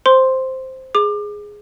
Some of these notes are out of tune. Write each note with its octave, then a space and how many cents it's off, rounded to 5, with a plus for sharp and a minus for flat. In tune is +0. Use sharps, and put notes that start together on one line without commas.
C5 +0 C6 +0
G#4 +0 D6 +30